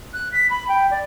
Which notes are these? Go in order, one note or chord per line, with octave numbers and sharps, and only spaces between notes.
F#6
B6
B5
G5
D5